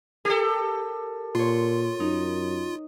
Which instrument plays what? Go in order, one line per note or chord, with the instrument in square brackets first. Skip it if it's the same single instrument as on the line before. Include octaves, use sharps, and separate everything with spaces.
[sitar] G4 A4 [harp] A#4
[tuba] A#2 [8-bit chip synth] F4 [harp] C#5 C6
[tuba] F#2 [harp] D#4